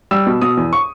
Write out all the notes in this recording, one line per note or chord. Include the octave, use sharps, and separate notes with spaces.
G3 E6
B2
B2 D#6
E2
C#6